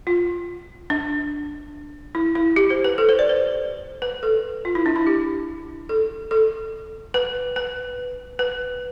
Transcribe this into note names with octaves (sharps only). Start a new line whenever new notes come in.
F4
D4
E4
E4
G4
C5
B4
A4
C5
D5
C5
B4
A4
F4
E4
D4
E4
G4
A4
A4
B4
B4
B4